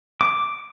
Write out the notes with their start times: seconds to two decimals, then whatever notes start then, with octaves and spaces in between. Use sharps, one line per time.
0.21 D6